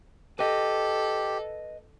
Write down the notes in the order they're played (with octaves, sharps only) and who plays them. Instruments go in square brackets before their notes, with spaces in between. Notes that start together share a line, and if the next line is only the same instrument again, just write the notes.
[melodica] G4 [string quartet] A4 [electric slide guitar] B4 D#5